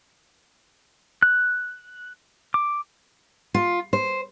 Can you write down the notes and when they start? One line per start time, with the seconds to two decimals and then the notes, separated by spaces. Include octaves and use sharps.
1.23 F#6
2.54 D6
3.54 F4
3.93 C5